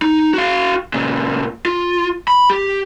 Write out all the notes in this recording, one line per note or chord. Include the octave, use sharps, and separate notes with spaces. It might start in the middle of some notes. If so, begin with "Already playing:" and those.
D#4
F#4 F5
A#2 C#3
F4
B5
G4